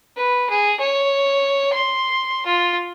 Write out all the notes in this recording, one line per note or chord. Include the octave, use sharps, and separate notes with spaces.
B4
G#4
C#5
C6
F4